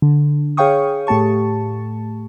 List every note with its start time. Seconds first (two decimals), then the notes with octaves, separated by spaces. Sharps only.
0.02 D3
0.57 G#4 C#5 F5 G5 C#6 D#6
1.07 A2 A3 G4 A5 C#6